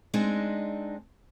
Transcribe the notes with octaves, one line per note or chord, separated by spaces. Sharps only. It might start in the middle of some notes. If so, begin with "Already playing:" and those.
G#3 C4 D4 D#4